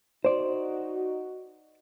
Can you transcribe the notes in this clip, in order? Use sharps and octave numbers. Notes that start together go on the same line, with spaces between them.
D#4 F#4 C5 D5